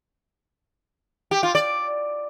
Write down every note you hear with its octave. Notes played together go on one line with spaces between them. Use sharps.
G4
F4
D5